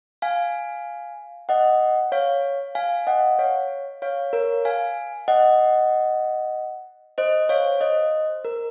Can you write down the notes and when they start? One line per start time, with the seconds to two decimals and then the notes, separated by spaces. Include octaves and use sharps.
0.22 F5 G#5
1.49 D#5 F#5
2.12 C#5 F5
2.75 F5 G#5
3.07 D#5 F#5
3.39 C#5 F5
4.02 C#5 F5
4.33 A#4 C#5
4.65 F5 G#5
5.28 D#5 F#5
7.18 C5 D#5
7.49 C#5 F5
7.81 C5 D#5
8.45 A#4